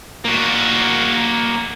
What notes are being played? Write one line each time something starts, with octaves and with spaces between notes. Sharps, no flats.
A#3 F#4